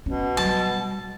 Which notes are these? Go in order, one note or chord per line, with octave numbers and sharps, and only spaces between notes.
B2 C#4
F#3 G3 A5